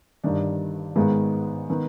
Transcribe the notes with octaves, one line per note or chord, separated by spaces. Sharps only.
G1 G2 D#3 G3 D4
G#1 G#2 D#3 G#3 B3
D#3 B3